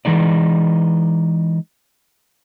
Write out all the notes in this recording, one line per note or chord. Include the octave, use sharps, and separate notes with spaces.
E3 G#3 D#4 D5